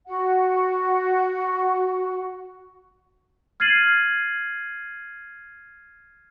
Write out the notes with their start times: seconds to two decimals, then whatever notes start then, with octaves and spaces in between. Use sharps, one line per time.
0.07 F#4 F#5
3.60 F6 G#6 A6 C7 D#7 F#7